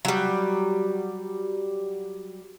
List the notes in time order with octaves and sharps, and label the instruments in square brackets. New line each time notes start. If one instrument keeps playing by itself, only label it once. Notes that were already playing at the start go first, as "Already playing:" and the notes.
[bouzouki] F#3 G3